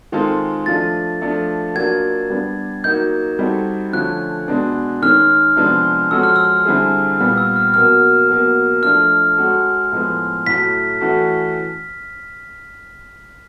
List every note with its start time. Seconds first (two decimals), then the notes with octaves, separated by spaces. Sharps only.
0.12 D#3 G#3 C4 F4 A4
0.66 F3 A3 D4 F4 A6
1.21 F3 A3 D4 F4 A4
1.75 F#3 A#3 D4 F4 G#6
2.30 G3 B3 D4
2.84 F#3 A#3 D#4 G6
3.39 G3 C4 D#4 F#4 A4
3.93 D3 F3 A3 C#4 F4 F#6
4.48 B2 G#3 B3 D4
5.02 D#3 G#3 C#4 F6
5.56 C3 F3 G#3 B3 D4
6.11 F3 G#3 C#4 F#4 A4 E6
6.23 F6
6.36 E6
6.65 D3 G3 C4 E4 G#4
7.19 A#2 G3 B3 F6
7.38 E6
7.56 F6
7.74 B2 F#3 A#3 F6
8.28 B2 F#3 A#3
8.83 F3 A3 D4 F4 F6
9.37 G#3 C#4 F#4 A4
9.92 A2 F3 G#3 B3
10.46 A2 F#3 A3 B6
11.00 E3 A3 C#4 F#4 A4